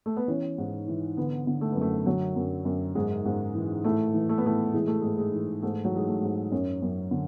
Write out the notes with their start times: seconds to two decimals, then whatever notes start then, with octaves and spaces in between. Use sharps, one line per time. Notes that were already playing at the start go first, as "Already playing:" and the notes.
0.06 A3
0.17 B3
0.28 E3 C#4
0.58 G#2
0.88 E3
1.17 D3 B3
1.47 D3
1.61 A3
1.72 F#2 B3
1.81 A3
2.06 D3 F#3
2.36 F#2
2.65 F#2
2.95 G#2 G#3
3.25 G#2
3.55 E3
3.84 A2 A3
4.14 E3
4.29 A3
4.38 B3
4.44 A2 A3
4.73 E3 G#3
4.87 A3
5.01 G#2 G#3
5.18 G#3
5.34 E3
5.62 G#2 A3
5.85 F#3
5.92 E3 G#3
6.08 A3
6.22 G#2
6.52 F#2 C#4
6.82 F#2
7.11 D3